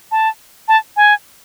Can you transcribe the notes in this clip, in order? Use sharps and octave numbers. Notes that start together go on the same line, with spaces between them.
A5
A5
G#5